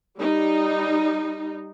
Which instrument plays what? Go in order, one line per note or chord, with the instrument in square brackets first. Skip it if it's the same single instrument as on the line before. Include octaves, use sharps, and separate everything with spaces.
[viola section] G3 D#4